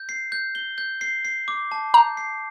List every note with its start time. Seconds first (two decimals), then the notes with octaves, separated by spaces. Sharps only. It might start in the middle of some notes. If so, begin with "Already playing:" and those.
Already playing: G6
0.09 C7
0.32 G6
0.55 G7
0.78 G6
1.01 C7
1.25 C7
1.48 D6
1.72 A5
1.94 A#5 G6
2.17 C7